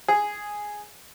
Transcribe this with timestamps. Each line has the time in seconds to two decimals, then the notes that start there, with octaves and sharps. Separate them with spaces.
0.08 G#4